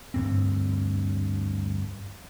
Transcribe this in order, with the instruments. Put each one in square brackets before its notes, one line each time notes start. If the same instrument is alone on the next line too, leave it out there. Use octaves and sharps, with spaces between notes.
[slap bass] D2 G2 C4